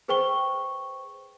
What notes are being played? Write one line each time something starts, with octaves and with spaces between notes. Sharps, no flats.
G#4 B4 C5 G5 C#6 G7